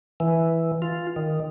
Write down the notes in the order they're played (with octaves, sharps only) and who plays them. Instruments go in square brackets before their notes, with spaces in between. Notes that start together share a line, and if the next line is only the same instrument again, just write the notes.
[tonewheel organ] E3
F4
D#3